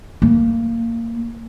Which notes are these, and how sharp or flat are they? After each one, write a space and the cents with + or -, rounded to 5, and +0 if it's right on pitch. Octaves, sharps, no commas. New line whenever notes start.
A#3 -20